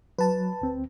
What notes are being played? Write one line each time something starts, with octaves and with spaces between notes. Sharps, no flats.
F#3 B4 A5
D2 C4